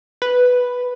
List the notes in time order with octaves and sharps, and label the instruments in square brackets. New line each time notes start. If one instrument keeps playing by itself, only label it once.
[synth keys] B4